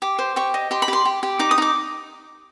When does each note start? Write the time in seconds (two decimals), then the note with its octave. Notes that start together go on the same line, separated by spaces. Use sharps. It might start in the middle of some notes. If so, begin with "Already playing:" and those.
0.02 G4 D6
0.19 C5
0.36 G4 C#6
0.54 D#5
0.71 G4 C6
0.82 B5
0.88 G4 C6
1.05 G4
1.23 G4
1.39 D#4 D6
1.51 D#6
1.58 D#4 D6